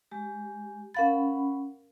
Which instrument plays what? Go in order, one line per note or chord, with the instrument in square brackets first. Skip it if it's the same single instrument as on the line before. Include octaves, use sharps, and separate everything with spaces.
[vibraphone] G#3 G4
[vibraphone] C#4 F#5 B5 [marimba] A#4 F5 A6